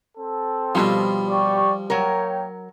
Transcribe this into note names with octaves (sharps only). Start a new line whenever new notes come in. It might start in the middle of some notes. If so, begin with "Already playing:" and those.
C4 A4
B2 F3 G3 E4 F4
G4 D5 C#6
F#3 A#3 A#4 C#5 G5